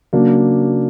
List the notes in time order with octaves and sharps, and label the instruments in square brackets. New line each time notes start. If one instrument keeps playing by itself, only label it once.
[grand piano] C#3 F#3 A#3 D4